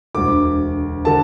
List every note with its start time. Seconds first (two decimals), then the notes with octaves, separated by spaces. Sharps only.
0.15 E1 D2 D3 D6
1.05 D3 A5